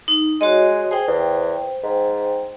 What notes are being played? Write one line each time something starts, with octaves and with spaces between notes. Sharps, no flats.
D#4
G#3 F#4 C#5 D#5
G#4 C5 G5
E2
G#2